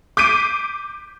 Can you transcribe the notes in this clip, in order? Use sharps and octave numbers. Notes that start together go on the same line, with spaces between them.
D6 G6 B6 C7 D7 D#7